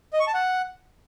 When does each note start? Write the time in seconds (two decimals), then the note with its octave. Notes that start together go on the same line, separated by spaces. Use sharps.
0.13 D#5
0.20 C#6
0.27 A5
0.34 F#5